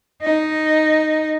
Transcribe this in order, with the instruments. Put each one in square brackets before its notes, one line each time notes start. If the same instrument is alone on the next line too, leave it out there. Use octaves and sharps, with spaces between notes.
[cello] D#4